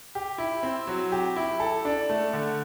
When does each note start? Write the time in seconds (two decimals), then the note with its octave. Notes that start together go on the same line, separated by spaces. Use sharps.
0.15 G4
0.38 E4
0.63 C4
0.87 F#3
1.12 G4
1.36 E4
1.60 A4
1.85 D4
2.10 A3
2.33 D3